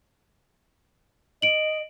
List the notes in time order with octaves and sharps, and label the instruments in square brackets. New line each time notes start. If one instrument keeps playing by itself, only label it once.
[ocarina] D#5 [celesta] D7 F#7